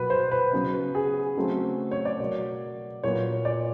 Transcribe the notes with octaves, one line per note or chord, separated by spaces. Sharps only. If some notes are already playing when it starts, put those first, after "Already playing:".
Already playing: B2 F#3 A#3 B4
C5
B4
C#3 F#3 B3
G#4
C#3 F#3 A3 C4
C#5
D5
B2 F#3 A#3
A#2 F#3 B3 C#5
D5